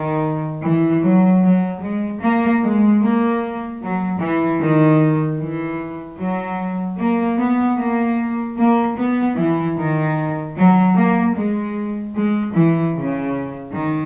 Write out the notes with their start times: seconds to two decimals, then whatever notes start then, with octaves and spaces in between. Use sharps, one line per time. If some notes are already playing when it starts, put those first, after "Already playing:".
Already playing: D#3
0.63 E3
1.02 F#3
1.43 F#3
1.82 G#3
2.21 A#3
2.61 G#3
3.01 A#3
3.81 F#3
4.20 E3
4.60 D#3
5.39 E3
6.19 F#3
6.98 A#3
7.38 B3
7.77 A#3
8.57 A#3
8.96 B3
9.36 E3
9.76 D#3
10.56 F#3
10.96 A#3
11.35 G#3
12.14 G#3
12.54 E3
12.94 C#3
13.73 D#3